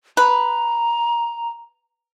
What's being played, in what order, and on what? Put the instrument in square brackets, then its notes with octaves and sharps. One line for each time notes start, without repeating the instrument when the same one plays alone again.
[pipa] B4 [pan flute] A#5